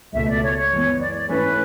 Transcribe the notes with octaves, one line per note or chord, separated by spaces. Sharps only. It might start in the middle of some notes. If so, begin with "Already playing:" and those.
C#2 B2 A3 E5
D5
C#5
C#5
F#2 E3 G#3 B3
D5
D5
G#2 E3 A3 C#4 B4